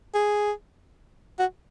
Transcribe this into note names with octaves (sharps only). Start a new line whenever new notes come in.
G#4
F#4